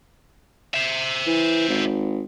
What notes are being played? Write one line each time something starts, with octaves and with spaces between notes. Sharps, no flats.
C5 E5
E3
G#1